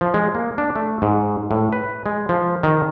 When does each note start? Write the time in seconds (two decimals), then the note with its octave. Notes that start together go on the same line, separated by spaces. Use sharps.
0.01 F3
0.14 G#3
0.35 A#3
0.58 D4
0.76 A3
1.02 G#2
1.51 A2
1.72 B4
2.06 G#3
2.29 F3
2.63 D#3